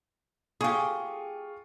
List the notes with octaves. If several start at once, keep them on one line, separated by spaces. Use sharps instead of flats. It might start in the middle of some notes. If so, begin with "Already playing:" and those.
F4 G4 G#4 C#6 D#6